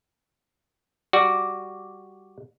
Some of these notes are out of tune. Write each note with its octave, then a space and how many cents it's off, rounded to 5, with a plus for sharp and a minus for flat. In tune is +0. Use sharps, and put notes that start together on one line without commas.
G3 +0 F#4 +0 D5 +0